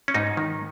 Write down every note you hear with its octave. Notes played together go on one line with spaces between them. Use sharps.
C#4
G#2 D#4
D#3